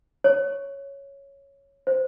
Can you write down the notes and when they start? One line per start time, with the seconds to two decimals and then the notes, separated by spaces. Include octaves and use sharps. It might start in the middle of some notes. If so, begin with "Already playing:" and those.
0.24 C#5
1.87 C5